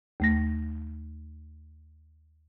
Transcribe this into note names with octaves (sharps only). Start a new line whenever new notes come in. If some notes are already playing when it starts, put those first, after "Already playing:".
D#2 A3 A#6